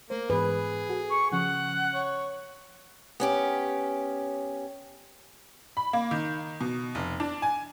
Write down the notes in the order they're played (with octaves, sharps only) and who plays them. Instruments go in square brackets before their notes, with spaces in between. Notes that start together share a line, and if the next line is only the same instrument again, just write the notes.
[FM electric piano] A3 C5 [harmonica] A#3
[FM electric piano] G#2 E3 [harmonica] G#4 [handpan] B4
[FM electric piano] F#4 A4 F#5
[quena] C#6
[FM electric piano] C#3 F3 C#4 [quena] F#5
[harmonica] C#5
[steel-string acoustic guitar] B3 C#4 G4
[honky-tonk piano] B5
A#3
D#3
B2
F1
D4
G#5